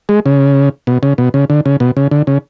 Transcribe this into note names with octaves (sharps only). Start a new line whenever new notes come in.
G#3
C#3
B2
C#3
B2
C#3
D3
C#3
B2
C#3
D3
C#3